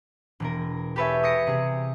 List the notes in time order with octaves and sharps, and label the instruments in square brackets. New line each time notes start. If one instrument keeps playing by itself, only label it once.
[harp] E1 B2 A#4
G4 A4 B4 C#5 E5 G#5
D#6 A#6 C#7 D7
C3 G#4